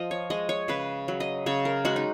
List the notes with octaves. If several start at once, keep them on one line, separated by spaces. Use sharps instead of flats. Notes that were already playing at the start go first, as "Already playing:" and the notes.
Already playing: F3 D#5
C#5
G#3 D#5
C#5
C#3 B4
F#3
D#5
C#3 C#5
A#4
G#3 F#4
D#4